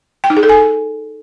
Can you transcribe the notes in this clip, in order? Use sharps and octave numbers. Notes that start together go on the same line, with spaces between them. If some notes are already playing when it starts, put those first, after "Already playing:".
G5
D#4
G#4
A4
G#5